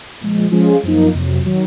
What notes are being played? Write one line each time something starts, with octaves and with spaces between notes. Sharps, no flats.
A#2 F3 G#3
F3 G#3 C#4 F4 G#4
F#2 F3 A#3 D#4
F2 C3 F#3
D#3 F#3